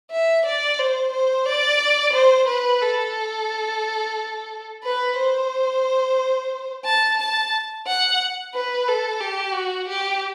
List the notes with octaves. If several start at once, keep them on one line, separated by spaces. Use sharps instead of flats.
E5
D5
C5
C5
D5
C5
B4
A4
B4
C5
A5
A5
F#5
B4
A4
G4
F#4
G4